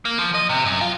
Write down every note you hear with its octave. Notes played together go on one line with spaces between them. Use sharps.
A#3
F3
D#5
C3
F#2
F4